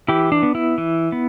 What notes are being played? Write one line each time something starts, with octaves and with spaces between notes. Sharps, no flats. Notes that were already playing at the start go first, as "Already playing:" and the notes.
E3 E4 G4
D4
B3
E4
E3
B3